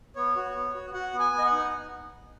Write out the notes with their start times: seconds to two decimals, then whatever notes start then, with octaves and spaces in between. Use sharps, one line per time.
0.16 B3 C#5
0.36 F#4
0.55 B3
0.74 F#4
0.94 F#4 F#5
1.13 B3
1.20 G#5
1.33 B3
1.39 D#5
1.45 F#5
1.52 D#4